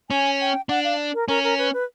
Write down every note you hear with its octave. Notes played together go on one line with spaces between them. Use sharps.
C#4 G#5
G5
D4 F#5
F5
A#4
C#4 A#4
A#4
B4
B4